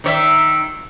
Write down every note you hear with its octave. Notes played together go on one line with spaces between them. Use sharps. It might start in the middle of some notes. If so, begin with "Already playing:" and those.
D#3 C#5 E5